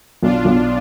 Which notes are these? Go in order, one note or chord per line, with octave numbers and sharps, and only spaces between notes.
B1 D4 F4
B1